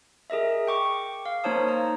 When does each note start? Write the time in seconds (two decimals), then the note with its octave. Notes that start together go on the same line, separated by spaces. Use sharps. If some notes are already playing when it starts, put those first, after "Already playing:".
0.30 G#4 A#4 D#5 E5
0.67 G5 C#6 D6
1.26 F5
1.44 A#3 D#4 C5 C#5 A5 D#6
1.68 A#5